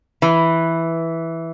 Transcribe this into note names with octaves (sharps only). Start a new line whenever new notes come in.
E3